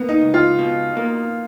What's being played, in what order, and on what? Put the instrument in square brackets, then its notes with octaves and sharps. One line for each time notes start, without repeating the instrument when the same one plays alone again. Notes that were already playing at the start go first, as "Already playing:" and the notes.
Already playing: [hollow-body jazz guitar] A#3 [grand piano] B3
[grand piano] D#4
[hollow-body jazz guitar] C#2
[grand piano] F4
[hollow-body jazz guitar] B2
A#3